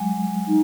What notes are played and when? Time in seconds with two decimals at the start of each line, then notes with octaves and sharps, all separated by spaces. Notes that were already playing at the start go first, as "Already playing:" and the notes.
Already playing: F#3 G#3
0.48 D#4